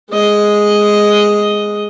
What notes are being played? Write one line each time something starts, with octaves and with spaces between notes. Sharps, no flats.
G#3 D#5